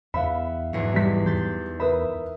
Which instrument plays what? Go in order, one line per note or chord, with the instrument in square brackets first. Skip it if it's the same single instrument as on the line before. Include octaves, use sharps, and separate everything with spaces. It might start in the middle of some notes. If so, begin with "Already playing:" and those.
[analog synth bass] E2 [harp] B3 E5 [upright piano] F5 B5
[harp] B1 E2 G#2
[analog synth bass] E3 [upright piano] G3 B6
[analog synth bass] E2 [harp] C6 G6 A6
[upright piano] A#4 B4 B5 [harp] E5 D#6